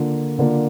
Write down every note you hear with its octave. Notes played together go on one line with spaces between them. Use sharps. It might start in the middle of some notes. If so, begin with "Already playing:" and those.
Already playing: D3 A#3 D4 F4
D3 A#3 D4 F4